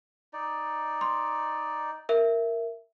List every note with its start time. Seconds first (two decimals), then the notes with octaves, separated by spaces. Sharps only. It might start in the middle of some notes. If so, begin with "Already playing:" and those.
0.33 D#4 D5
1.01 C6
2.09 A#4 E5